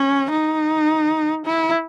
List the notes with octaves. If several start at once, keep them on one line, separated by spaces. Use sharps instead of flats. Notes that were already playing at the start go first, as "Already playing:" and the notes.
Already playing: C#4
D#4
E4